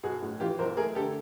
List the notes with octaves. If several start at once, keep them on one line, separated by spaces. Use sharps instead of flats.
B1 F#4 G#4
A2
E3 F4 G4
B1 A#4 C5
A3 G#4 A#4
D3 G4 A4